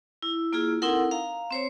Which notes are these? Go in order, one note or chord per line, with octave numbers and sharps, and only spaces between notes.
E4
A#3 E4 F4 G#4
C4 D#4 E4 A4 A#4 F#5
F5 A#5
C4 C5 C#5